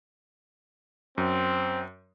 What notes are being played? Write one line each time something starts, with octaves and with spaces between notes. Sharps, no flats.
F#2 C4